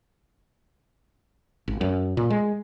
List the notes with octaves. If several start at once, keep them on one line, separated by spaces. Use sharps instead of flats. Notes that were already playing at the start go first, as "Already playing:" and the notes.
G#1
F#2
A#2
G#3